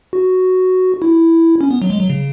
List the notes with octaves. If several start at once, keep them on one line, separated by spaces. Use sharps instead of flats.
F#4
E4
C#4
B3
F#3
G#3
F#3
C#3